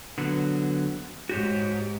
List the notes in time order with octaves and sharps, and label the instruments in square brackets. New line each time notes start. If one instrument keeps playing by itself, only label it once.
[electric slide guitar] D3 F#3 B3
[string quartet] G#2 [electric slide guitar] F#4 G4 C#5